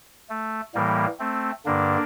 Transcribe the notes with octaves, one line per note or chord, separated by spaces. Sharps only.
A3
A2 E3 G3 A#3
A3 C4
G2 D3 A#3 D4